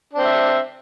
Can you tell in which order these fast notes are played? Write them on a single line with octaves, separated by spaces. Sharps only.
D4 C4 E5